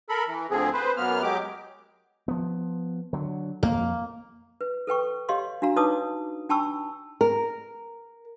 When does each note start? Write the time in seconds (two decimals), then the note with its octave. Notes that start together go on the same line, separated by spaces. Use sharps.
0.09 A4 A#4 B5
0.28 E3
0.51 D2 D3 F3 C4 G#4
0.73 B4 C5
0.97 F#2 A#3 B3 F6
1.23 F#3 G#3 G4 D6
2.28 F3 B3
3.13 D3 F#3
3.63 F2 A#3
4.61 B4
4.87 A4 B4 G5 C#6
5.29 G4 C#5 D#5 F5 C6
5.62 D4 F#4 F5 A#5
5.76 D#4 B4 C#5 A5 D6 D#6
6.49 D4 G5 A5 B5 C#6 E6
7.21 A#4